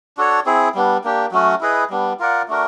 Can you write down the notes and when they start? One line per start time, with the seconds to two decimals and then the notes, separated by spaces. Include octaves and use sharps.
0.17 D4 F#4 A4 C#5
0.46 C4 E4 G#4
0.75 G3 B3 D4
1.04 A#3 D4 G4
1.32 F#3 A3 C#4 F#4
1.61 E4 G#4 B4 D#5
1.90 G3 B3 D4
2.20 F4 A#4 D5 F#5
2.48 A3 D4 F#4 A#4